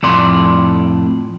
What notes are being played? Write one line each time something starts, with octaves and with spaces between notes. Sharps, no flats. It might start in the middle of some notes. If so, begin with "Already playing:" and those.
F2 A2 D5 C6